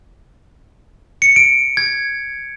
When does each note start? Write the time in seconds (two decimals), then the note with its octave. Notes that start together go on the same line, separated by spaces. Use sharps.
1.22 C#7
1.36 D7
1.77 G#6